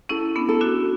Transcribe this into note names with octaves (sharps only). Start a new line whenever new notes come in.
C#4 E4 A4
B3 D4
A4
D4 F#4